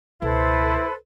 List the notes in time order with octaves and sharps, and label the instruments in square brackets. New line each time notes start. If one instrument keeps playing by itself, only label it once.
[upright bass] C#2 B2 [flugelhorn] E4 [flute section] A4 B4 C5